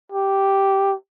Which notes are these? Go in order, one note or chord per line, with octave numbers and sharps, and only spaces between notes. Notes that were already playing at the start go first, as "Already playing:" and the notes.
G4